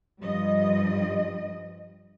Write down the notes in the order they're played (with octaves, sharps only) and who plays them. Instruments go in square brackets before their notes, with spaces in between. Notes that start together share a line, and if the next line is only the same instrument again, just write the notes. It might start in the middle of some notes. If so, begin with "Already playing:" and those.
[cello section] G2 F3 G3 D#5